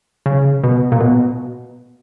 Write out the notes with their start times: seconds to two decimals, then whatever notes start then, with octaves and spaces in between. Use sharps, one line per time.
0.26 C#3
0.64 B2
0.92 A#2
1.00 B2